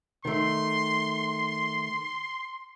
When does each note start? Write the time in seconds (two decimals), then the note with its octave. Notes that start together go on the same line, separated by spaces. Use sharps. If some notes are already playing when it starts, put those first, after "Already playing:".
0.25 D#3 A3 C6